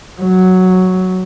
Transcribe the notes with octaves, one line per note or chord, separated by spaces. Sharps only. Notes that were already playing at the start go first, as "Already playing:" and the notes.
F#3